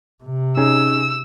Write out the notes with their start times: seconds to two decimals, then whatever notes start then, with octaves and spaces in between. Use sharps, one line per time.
0.24 C3
0.57 C#4 D#4 G#4 E6